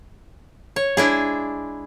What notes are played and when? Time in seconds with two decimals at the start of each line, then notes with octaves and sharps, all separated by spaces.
0.76 C#5
0.97 G#3 D4 E4 G#4